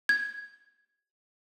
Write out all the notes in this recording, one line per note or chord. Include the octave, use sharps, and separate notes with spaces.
G#6